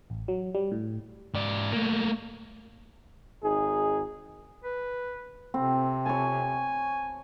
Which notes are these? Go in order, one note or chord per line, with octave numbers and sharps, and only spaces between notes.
A1
F#3
G3
A2
G#2 D5
A3 A#3
G#1 D#4 G#4
B4
C3 C4
C#5 G#5 A5